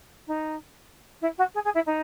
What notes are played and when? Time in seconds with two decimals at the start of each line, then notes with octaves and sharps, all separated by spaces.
0.27 D#4
1.21 E4
1.38 F#4
1.54 G#4
1.64 G#4
1.74 E4
1.86 D#4